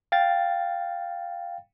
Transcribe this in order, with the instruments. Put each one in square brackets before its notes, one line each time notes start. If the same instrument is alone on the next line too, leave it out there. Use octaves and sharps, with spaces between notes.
[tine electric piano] F5 G5 A6